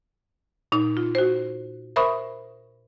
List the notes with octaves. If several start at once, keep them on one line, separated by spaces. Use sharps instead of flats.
A#2 D#4
F4
F#4 C5
A#4 C5 E5 B5 C#6 D#6